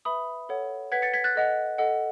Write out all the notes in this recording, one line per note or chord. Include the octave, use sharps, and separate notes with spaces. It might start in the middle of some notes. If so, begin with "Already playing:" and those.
B4 E5 B5 D#6
A4 C#5 F#5
B4 F#5 G#6 B6
A6 C#7
G#6 B6
F#6 A6
A4 D#5 F#5
A4 D#5 F#5